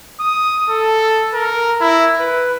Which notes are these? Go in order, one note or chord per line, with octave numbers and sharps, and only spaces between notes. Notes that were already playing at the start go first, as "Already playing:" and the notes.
D#6
A4
A#4
E4
B4